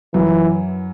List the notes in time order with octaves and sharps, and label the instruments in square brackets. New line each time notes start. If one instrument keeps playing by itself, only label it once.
[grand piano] F#2 F#3 [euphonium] E3